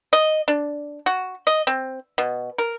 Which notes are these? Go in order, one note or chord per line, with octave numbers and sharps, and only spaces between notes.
D#5
D4
F#4
D#5
C4
B2
A#4